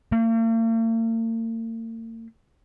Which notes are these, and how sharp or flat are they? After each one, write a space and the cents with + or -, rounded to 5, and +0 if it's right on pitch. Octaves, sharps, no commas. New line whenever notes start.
A#3 -45